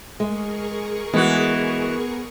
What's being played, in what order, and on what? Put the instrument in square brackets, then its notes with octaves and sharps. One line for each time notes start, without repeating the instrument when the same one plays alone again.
[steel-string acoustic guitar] G#3 [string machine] G#4 A#4 C#6
[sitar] E3 F#4 [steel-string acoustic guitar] G#3 [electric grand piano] B3